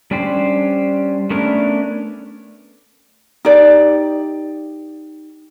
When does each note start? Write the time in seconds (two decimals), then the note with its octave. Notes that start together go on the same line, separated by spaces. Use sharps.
0.11 G3 C#4 D4 G4 C5
1.30 A3 B3 C#4 D4 A#4
3.45 D#4 G4 D5